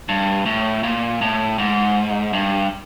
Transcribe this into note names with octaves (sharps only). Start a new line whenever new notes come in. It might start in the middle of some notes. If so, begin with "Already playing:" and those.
G2
A2
A#2
A2
G#2
G2